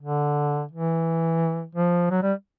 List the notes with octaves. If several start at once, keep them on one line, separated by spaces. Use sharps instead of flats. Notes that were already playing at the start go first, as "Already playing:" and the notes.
D3
E3
F3
F#3
G3